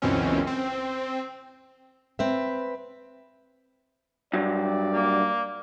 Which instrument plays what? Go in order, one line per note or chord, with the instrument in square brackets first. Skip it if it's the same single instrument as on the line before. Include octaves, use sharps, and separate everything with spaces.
[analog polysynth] C#2 F#2 B2 E3 C4 C#4
C4
[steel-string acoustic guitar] C4 B4 E5
[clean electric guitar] G2 F#3 [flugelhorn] D5
[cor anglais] A#3